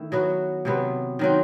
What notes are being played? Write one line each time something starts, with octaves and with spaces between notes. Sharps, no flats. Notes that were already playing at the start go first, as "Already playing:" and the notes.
Already playing: D#3 A3 E4
F#3 B3 F#4
C3 F#3 B3
D#3 F#3 C4